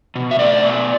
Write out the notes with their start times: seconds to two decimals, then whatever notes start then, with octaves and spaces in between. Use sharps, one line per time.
0.16 B2
0.31 E5
0.39 A3 D5
0.63 B2